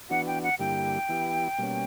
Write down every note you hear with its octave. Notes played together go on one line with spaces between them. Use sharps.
E3 B3 D4 F#4 F#5
G5
F#5
G2 D3 A#3 E4 G4 G5
E3 B3 E4 G4
B2 G3 A#3 C#4